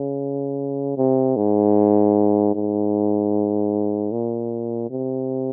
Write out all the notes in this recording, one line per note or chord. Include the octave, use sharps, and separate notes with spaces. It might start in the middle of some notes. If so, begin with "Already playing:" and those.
Already playing: C#3
C3
G#2
G#2
A#2
C3